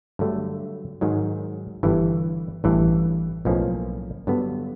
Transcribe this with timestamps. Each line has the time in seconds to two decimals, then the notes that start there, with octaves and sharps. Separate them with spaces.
0.19 G2 D3 F#3 A3
1.01 G#2 D#3 F#3
1.83 G1 G2 E3
2.64 A1 G2 E3
3.45 B1 A2 F3 A#3 C#4
4.27 G2 D3 F#3 B3